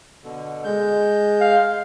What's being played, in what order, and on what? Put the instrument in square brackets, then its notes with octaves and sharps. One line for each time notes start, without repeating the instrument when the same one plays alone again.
[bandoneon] B2 D3
G#3 G6
[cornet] F5